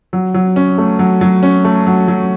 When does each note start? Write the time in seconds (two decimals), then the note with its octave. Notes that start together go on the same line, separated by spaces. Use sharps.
0.13 F#3
0.34 F#3
0.56 C#4
0.78 A3
0.99 F#3
1.21 F#3
1.43 C#4
1.64 A3
1.87 F#3
2.08 F#3